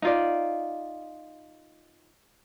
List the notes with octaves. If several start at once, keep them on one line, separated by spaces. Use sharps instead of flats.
D#4 F4 D5